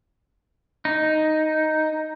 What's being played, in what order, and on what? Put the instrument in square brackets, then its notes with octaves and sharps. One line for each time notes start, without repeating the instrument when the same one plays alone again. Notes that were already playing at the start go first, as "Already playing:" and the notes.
[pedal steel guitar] D#4